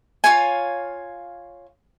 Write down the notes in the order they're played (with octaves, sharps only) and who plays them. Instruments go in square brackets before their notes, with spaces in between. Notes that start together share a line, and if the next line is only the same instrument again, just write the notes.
[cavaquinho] F4 C#5 F5 G#5